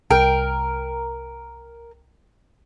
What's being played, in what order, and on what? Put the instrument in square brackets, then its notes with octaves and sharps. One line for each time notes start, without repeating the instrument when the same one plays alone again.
[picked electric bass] C2 [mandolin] A#4 [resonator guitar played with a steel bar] G5